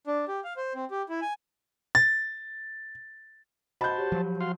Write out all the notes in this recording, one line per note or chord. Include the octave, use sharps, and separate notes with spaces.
D4
G4
F5
C5
C4
G4
E4
G#5
A6
F#4 C5 D#5 A5 B5 G6
G4 C#5
F3 F#3
F#4 F5 C6